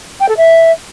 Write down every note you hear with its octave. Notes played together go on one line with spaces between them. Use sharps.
G5
A4
E5